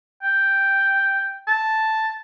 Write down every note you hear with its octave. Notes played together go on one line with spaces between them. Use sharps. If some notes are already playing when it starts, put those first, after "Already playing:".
G5
A5